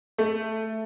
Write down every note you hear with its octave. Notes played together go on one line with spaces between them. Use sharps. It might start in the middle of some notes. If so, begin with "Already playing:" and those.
A3